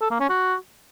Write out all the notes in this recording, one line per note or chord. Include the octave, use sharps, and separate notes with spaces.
A4
A#3
C#4
F#4